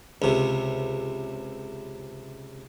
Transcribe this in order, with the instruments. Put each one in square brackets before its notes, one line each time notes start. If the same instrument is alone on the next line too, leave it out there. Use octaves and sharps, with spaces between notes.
[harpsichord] C#2 C3